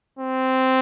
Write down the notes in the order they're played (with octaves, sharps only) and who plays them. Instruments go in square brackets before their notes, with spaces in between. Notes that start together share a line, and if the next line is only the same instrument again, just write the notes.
[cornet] C4